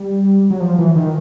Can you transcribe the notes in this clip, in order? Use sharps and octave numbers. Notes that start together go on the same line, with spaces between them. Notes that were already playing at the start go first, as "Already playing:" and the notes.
Already playing: G3
F#3
F3
E3
D#3